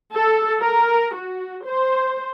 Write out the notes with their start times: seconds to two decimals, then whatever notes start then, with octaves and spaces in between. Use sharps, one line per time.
0.15 A4
0.61 A#4
1.16 F#4
1.64 C5